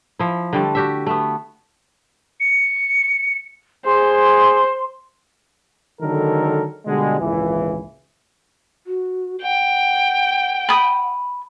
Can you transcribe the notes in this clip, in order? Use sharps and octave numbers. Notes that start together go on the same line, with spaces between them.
F3 E4
D3 G3 A3
F#4 G4 E5
A3 B3
C#7
G#4 C5 C6
D3 D#3 F#3 G#3 A4 A#4
B2 D3 G3 G#3
G#1 C#2 A#2 E3
F#4
F#5 G5
B5 D#6